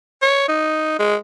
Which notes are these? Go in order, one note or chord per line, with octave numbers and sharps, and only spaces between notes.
C#5
D#4
G#3